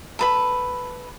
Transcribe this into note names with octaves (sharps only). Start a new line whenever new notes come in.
A4 B4 B5